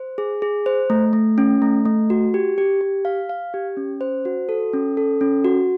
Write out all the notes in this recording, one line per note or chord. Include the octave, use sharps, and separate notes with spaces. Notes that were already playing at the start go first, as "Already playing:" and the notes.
Already playing: C5
G#4
G#4
C5
A3
A3
C#4
A3
A3
F#4
G4
G4
G4
F5
F5
G4
C#4
C5
F#4
A4
C#4
A4
C#4
F#4